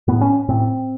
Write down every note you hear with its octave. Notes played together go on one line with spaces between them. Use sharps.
A2 B3
C#4
A2 C4